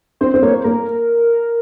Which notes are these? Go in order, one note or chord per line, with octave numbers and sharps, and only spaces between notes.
C4 C5
C4
A#3 C#5
C5
A#3 A#4